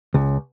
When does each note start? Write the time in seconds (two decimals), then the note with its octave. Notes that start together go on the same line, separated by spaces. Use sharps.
0.14 C#2